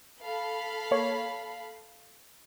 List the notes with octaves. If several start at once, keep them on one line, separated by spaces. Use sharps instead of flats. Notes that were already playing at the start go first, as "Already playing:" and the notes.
A4 F5 B5
A#3 C#5